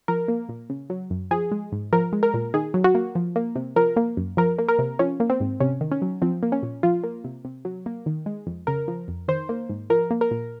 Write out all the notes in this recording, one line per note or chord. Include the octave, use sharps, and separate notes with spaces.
F3 A#4
A#3
A#2
C#3
F#3
F#2
F3 G#4
G#3
G#2
F3 A#4
G#3
A#4
A#2
D#3 G#4
F#3
F#4
A#3
F3
A#3
C3
F3 A#4
A#3
F#2
F3 A#4
A#3
A#4
C3
F3 C#4
A#3
C4
G#2
C3 C#4
D#3
C#4
F#3
F3 C4
A#3
C#4
A#2
F3 F4
A#3
C3
C3
F#3
A#3
D#3
G#3
F2
C#3 A#4
F3
F2
D#3 C5
A#3
G#2
F3 A#4
A#3
A#4
A#2